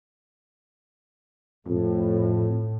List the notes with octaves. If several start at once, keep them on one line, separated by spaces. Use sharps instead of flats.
F2 A2